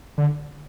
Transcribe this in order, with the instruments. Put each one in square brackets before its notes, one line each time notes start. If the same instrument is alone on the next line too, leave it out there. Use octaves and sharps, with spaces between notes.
[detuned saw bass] D3